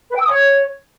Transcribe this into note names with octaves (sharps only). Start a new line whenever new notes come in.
B4
G5
E6
D#6
C#5